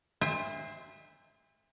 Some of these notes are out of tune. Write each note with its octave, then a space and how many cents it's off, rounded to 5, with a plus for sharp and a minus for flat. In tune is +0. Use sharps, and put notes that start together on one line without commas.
C5 +0 E5 +0 G#5 -45